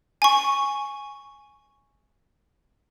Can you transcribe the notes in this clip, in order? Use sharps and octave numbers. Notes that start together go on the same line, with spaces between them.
G#5 C#6